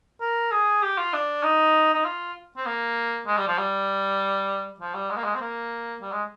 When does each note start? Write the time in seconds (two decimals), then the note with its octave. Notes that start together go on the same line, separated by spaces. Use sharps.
0.21 A#4
0.52 G#4
0.82 G4
0.98 F4
1.14 D4
1.43 D#4
1.94 D#4
2.05 F4
2.57 C4
2.66 A#3
3.27 G#3
3.37 G3
3.48 F3
3.58 G3
4.80 F3
4.95 G3
5.10 G#3
5.17 A#3
5.24 G#3
5.35 C4
5.41 A#3
6.02 G3
6.12 G#3